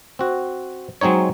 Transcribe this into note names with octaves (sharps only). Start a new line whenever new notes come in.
C4 F#4
F#3 G#3 C4 D#4 C#5